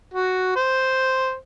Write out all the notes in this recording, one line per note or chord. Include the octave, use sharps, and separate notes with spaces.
F#4
C5